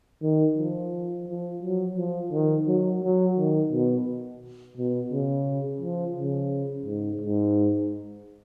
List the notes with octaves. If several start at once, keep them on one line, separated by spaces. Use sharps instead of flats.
D#3
F3
F3
F#3
F3
D#3
F#3
F#3
D#3
B2
B2
C#3
F3
C#3
G#2
G#2